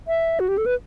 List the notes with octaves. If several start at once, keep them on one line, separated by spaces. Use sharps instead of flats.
E5
F#4
G4
A4
B4